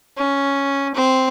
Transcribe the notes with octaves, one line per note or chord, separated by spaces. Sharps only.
C#4
C4